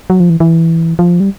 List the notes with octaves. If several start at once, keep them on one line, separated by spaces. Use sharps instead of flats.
F#3
F3
E3
E3
F3
G3